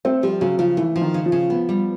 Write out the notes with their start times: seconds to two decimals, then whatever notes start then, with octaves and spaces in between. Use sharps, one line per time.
0.05 A3 C4
0.23 F3 G3
0.41 C#3 F#3
0.59 C#3 F3
0.77 E3 A3
0.96 F3
1.01 D#3
1.14 C#3
1.26 F3
1.32 C#3
1.50 B3
1.69 G3